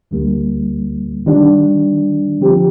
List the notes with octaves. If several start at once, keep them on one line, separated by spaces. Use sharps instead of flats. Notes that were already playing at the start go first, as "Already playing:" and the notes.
D2 D3 G3 A#3
D#3 G3 D4
D3 F3 C4 G4